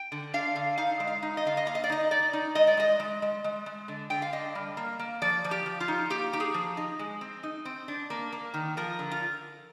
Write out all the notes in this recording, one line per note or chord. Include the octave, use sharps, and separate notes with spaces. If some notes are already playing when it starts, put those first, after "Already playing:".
Already playing: G5
D3
D4 F5
D3
D#4 F5
G#3
F5
D#4
D#5
D3 F5
D#5
A#3 F5
D#5
D5
D#4 D#5
D#4 D5
D#4
G#3 D#5
D5
G#3 D#5
G#3
G#3
G#3
G#3
D3
D3 G5
F5
D4 D#5
G3
A#3
A#3
F3 D5
F3
G4
F3
F4
D#4
A#3 G4
D#4 G4
G#4
F3
D#4
G#3
C4
D#4
C4
D4
A#3
A#3
D#3
F3 A#4
D3
F4